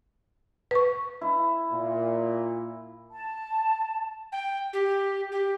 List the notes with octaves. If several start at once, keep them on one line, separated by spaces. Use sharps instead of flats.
B4 C#6
E4
A#2
A5
G5
G4
G4